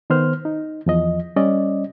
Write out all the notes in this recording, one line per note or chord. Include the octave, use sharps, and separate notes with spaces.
D#3 B3 C5 F6
D#4
E2 F3 D#5
G3 C#4 D5 D#5